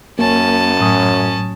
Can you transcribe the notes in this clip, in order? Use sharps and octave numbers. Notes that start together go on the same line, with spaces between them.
F#2 A#3 C#4 A5
A2 F#3 D#6